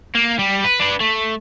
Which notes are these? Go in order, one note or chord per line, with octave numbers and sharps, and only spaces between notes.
A#3
G3
B4
D4 B4
A3